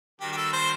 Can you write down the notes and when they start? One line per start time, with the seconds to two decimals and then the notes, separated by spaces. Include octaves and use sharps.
0.20 D#3 G3 D4 F#4 G4
0.32 G4
0.37 A4
0.53 C5